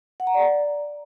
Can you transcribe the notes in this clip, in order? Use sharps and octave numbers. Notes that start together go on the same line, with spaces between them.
F#5
A#5
D5